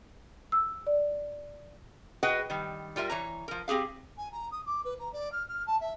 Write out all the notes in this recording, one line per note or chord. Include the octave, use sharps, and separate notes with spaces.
E6
D5
F#4 G#4 B4 D#5 F#5 G5
D#3 G3
G3 F4 A#4 E5
E3 C#5 A#5
F3 A#4
C4 G4 G#4 F5
G#5
A#5
D#6
D6
B4
A#5
D5
F6
F6
A5
E5